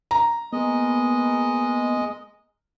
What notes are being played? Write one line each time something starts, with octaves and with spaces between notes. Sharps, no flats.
A#5
G#3 A#3 B3 D#5